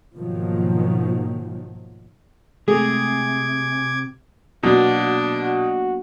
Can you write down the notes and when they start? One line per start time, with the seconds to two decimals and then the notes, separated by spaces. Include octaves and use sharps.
0.16 G#2 B2 D#3 F3 F#3 A#3
2.68 C3 G#3 A3 G#4 D6 G#6
4.64 B2 F#3 A#3 B3 D4 F#4
5.41 F#4